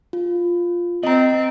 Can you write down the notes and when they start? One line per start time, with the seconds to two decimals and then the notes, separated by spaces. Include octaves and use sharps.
0.13 F4
1.03 C4 D#5 A#5